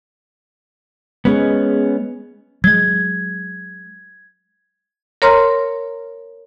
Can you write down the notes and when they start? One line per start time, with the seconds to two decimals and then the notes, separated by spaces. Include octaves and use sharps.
1.25 G#3 B3 C#4 G#4
2.64 F#3 G#3 G#6
5.22 A#4 C#5 A#5 C6 F6